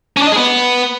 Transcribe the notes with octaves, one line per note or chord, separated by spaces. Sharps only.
C#4
D4
D#5
G#4
B3